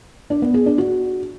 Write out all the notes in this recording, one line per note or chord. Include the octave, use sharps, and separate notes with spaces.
D4
B3
G#4
D4
F#4